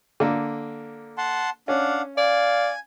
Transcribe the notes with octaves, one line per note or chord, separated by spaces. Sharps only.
D3 A#3
F#5 A5 C6
C#4 D4 F5 F#5
D5 F5 G#5